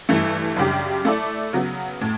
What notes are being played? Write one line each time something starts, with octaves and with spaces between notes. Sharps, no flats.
G2 E3 A3
F#2 C#3 G3 D4 G4
A3 E4 A4 D5
C#3 F#3 B3
A2